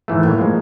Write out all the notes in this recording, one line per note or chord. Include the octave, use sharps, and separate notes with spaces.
G#2 E3 A3
A2 A#3
F3 G#3